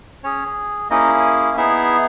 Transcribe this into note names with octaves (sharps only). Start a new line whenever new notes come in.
C#4 G#4 C#5
A#3 C#4 D#4 E4 G#4 D#5
B3 D#4 E4 G#4 E5